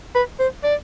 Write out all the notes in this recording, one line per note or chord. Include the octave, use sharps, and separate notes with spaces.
B4
C5
D5